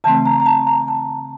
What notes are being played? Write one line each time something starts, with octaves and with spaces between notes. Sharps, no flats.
C#3 E3 A3 C4 A5
A#5
A#5
A5
A#5
A5